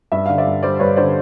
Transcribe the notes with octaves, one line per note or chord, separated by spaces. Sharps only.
G2 E5
D3 F5
D5 E5
G2
G3 C5 D5
G2 B4 C#5
D3 C5 D5